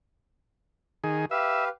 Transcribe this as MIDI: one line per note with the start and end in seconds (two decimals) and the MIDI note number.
1.04 1.25 51
1.04 1.25 68
1.31 1.69 67
1.31 1.69 71
1.31 1.65 76
1.31 1.69 77